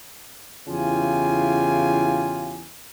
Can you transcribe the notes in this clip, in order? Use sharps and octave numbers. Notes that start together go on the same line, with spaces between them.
E2 C#3 E4 F4 G4 G#5